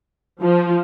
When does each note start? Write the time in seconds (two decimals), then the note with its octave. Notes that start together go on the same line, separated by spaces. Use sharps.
0.42 F3